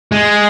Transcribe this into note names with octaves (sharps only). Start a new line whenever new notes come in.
G#3